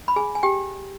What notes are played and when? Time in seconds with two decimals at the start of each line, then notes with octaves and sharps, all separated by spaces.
0.08 B5
0.16 G#4 G#5
0.35 G#5
0.43 G4 G5